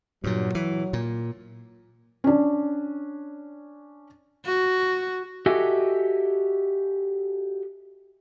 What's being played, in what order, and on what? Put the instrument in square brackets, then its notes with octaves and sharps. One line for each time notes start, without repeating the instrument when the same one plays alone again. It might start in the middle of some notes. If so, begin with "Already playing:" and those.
[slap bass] G2 A#2 [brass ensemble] F#3
[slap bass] E3
A#2
[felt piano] C#4 D4
[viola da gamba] F#4
[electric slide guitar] F#4 G4 A4 D#5 E5 G#5